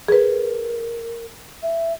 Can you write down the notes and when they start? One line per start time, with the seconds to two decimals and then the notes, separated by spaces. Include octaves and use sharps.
0.08 G#4 A#4 B4
1.63 E5